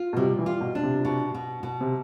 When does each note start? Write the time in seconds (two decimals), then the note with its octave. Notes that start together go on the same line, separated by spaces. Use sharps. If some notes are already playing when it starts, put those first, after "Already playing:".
Already playing: F4
0.13 B2
0.17 C3 G3
0.39 E3
0.46 F4
0.61 B2
0.75 D4
0.83 C3
1.05 B2
1.34 B2
1.63 B2
1.81 C3